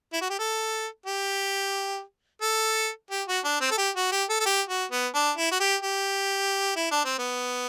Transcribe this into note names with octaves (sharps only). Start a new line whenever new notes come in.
E4
F#4
G4
A4
G4
A4
G4
F#4
D4
C4
A4
G4
F#4
G4
A4
A4
G4
F#4
B3
D4
E4
F#4
G4
G4
E4
D4
C4
B3